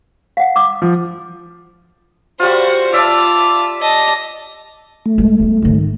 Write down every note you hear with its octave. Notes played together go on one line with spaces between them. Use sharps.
F5 F#5
D6 D#6
F3
G3 F4 F#4 C5
F4 D5 E5 A5 D6
D#5 A5
A3
G#3
G3 B3
G#2 D#3